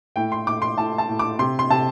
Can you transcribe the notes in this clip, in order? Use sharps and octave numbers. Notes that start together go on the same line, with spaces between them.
A2 G5
C6
A2 D6
C6
A2 A5
A5
A2
D6
C3 C6
C6
C3 A5